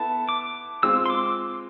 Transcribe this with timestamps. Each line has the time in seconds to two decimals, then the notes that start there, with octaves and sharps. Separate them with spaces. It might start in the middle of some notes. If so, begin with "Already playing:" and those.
Already playing: B3 E4 A4 A5
0.29 D6
0.83 G#3 C4 F4 E6
1.06 C6
1.10 D6